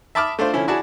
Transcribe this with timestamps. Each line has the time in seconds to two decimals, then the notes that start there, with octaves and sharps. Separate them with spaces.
0.15 E5 A5 B5 D6 D#6 F6
0.39 A3 D4 F4 C5
0.54 D3 F3 C#4 E4
0.68 E4 F#4 G#4 D5 A5